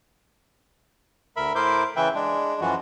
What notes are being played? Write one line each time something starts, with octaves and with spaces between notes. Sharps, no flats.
D2 A#4 E5 B5
A2 E4 A#4 C5 D6 G6
C#3 E3 B4 E5 G5
G#3 D4
F#2 E3 F3 F#4